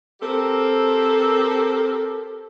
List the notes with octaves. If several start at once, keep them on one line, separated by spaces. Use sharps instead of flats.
C4 G4 A4 A#4